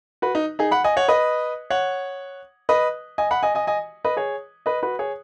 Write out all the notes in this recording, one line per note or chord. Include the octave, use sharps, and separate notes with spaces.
F#4 B4
D#4
D#4 G#4
F#5 B5
D#5 G#5
C#5 F#5
B4 D#5
C#5 F#5
B4 D#5
D#5 G#5
F#5 B5
D#5 G#5
D#5 G#5
D#5 G#5
B4 D#5
G#4 C#5
B4 D#5
F#4 B4
G#4 C#5